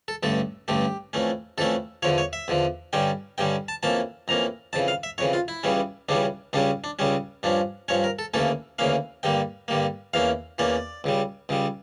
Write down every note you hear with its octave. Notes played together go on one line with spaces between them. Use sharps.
A4
A1 G2 D3 A3 A4
A1 G2 D3 A3 G4
F2 E3 A3 C#4
F2 E3 A3 C#4 A4
E2 D3 F3 C#5
C#5
E5
E2 D3 F3
G2 D3 G3 C#4 G5
G2 D3 G3 C#4 G5
A5
F2 E3 A#3 C#4 A5
F2 E3 A#3 C#4 A#5
F2 C#3 E3 A5
F5
E5
F2 C#3 E3 C#5
F4
E4
C#2 C#3 E3 G3 C#4
C#2 C#3 E3 G3 C#4 D4
C#2 C#3 G3 C#4 D4
D4
C#2 C#3 G3 C#4
G2 F3 C#4 D4
G2 F3 C#4 C#5
A#4
A4
D2 C#3 E3 A#3 C#4 A4
D2 C#3 E3 A#3 C#4 F5
G2 D3 G3 A#3 G5
G2 D3 G3 A#3
E2 E3 A#3 C#4 F5
E2 E3 A#3 C#4 D5
C#2 C#3 G3
C#2 C#3 G3